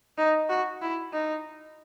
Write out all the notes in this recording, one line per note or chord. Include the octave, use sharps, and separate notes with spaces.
D#4
F#4
E4
D#4